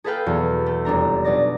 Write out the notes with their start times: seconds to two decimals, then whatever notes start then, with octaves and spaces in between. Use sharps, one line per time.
0.04 G#4 A4 B4 F5 G5 B5
0.26 E2 B2 F#3
0.66 A3
0.85 F1 G3 D4 A#5
1.24 B2 F#3 D#4 D5 A#6